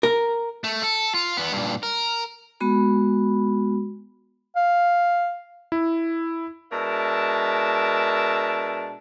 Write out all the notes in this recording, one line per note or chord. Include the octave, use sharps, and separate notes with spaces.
A#4
A3
A4
F4
E2 B3
G2 A#2
A#4
G#3 B3 F#4 B5
F5
E4
B2 G#3 D4 A#4 E5 A5